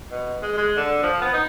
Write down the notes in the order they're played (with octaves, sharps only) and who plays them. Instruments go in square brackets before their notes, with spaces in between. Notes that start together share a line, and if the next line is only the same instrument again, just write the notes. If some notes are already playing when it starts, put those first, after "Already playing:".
[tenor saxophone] B2
G#3
G#3
D3
F3
B3
D#4